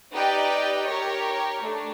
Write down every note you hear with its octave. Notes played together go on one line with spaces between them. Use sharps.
D#4 G4 B4 D5 G5
G4 A#4 C#5
A3 D4